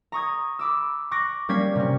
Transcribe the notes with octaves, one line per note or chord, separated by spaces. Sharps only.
A#5 C#6 D#6 G#6
B5 D6 E6
C#6 D6 F#6 A#6
G3 A#3 C#4 G#6 B6 C7
C3 C#4